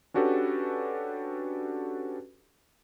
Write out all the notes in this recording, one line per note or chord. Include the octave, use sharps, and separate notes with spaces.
C#4 D4 F#4 G4 A4 B4